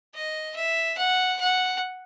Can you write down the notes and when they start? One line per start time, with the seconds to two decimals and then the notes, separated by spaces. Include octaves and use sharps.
0.14 D#5
0.56 E5
0.97 F#5
1.40 F#5